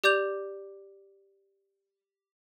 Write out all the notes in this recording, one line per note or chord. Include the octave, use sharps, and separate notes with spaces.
G4 D5 D6 G6 F7